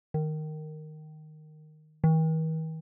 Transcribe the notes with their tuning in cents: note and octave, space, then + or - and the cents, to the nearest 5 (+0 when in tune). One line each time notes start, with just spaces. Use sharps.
D#3 -10
D#3 +45